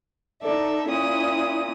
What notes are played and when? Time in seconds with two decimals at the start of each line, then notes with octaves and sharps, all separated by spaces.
0.41 D#4 A4 D5 E5
0.88 A#2 C#4 E4 D#6